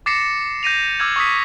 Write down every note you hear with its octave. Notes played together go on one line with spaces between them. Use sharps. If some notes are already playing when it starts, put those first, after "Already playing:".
D6 A6 A#6 C7 C#7 E7
G6 A#6 D#7 F7
D6 E6 F6 G#6 F#7
C#6 D#6 B6